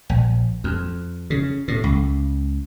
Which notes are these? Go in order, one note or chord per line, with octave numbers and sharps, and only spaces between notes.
A#1
F2
C#3
A2
C#2